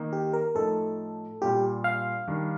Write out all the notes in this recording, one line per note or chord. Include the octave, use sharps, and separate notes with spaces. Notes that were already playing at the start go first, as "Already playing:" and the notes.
Already playing: D#3 A#3 D#4
G4
A#4
A2 F3 A3 D#4 A4
A#2 G3 A#3 D4 F4 G4
F5
D#3 G3 D4